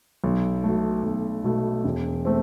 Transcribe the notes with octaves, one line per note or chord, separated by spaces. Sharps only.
B1
B2 A3
B1
B2 A3
E1
A3 C4